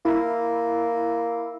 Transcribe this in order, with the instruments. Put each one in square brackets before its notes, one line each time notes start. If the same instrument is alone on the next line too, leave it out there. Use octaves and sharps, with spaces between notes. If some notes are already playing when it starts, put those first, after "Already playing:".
[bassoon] A#3 [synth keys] E4